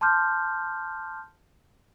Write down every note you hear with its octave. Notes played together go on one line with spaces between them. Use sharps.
A5 C6 D6 F6 G6